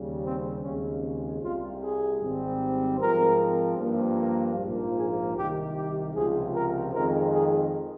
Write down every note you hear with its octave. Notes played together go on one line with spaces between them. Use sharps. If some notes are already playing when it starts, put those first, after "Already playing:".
Already playing: D#2 C#3 G3
C4
D#2 C#3 G#3 C4 C#4
C2 C3 G3 F4
G#4
G#1 G#2 G3 C4
G#2 F3 C4 A#4
G2 F3 A#3
A#4
A#1 G#2 F3 A#3
G#4
C2 C3 D#3 G4
G4
C#2 C3 F3 G#4
A#4
F2 D#3 G#3 C4 A#4
G#4